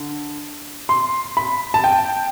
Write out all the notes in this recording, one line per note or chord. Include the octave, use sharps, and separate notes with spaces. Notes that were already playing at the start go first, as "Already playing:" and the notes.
Already playing: D3
C6
B5
A5
G5